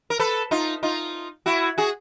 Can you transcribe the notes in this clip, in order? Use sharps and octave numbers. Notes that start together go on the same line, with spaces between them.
A#4
A4 B4
D#4 F4
D#4 F4
E4 F#4
F#4 G#4